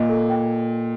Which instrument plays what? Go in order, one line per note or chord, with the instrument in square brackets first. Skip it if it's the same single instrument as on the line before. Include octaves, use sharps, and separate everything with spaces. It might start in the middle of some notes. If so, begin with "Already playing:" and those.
Already playing: [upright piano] A#2 [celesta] D#5
[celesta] A4
G5